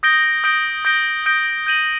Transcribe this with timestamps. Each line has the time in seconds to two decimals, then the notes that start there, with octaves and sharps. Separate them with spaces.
0.03 D#6 G6 A#6 D7 G7
0.44 D#6 G6 A#6 D7 G7
0.85 D#6 G6 A#6 D7 G7
1.26 D#6 G6 A#6 D7 G7
1.66 G6 A#6 D#7 F#7